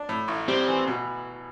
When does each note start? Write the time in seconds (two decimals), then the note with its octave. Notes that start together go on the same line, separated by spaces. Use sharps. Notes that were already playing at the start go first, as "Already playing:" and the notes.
Already playing: D4
0.09 A2
0.28 A1
0.48 G3 C4
0.68 E3
0.87 B2